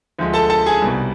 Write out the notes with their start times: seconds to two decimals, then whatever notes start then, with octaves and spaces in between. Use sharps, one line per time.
0.19 D2 D3 F3 G#3
0.34 A4 A5
0.50 A4 A5
0.66 G#4 G#5
0.82 C2 B2 G3